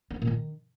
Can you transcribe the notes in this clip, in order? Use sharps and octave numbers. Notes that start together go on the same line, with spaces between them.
B3
G#3
A#2
D#3